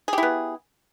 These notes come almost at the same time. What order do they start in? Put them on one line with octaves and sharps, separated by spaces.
G#4 G4 E4 B3